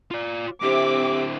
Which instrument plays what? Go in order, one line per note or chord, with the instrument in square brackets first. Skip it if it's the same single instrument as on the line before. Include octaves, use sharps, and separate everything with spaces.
[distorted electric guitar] F4 D5
[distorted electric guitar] D3 E4 [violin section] C4 E5 D6 [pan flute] G4